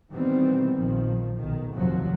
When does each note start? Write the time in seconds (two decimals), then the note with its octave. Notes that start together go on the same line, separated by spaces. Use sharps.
0.12 B2 D#3 E3 G3 B3 C4
0.75 A#1 D#3 F3
1.37 B1 D#3
1.75 F1 D#2 C3 F3 F#3